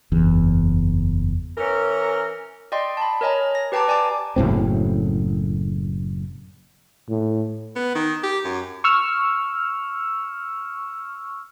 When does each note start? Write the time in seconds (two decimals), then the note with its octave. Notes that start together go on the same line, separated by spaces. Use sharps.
0.12 F#1 E2
1.57 E3 C#4 A#4
2.72 D5 D#5 G5 C6
2.97 A5 B5
3.21 A#4 C#5 D#5 G#5 A#5
3.55 A#6
3.72 G4 B4 G5 A5 A#5 D6
3.88 D5 G#5 A5 D6
4.36 F#1 B1 A2 C4
7.10 A2
7.76 B3
7.95 D#3
8.24 G4
8.45 F#2
8.84 C#6 E6 F6